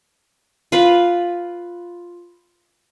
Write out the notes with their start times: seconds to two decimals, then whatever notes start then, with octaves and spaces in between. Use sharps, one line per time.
0.72 F4 B4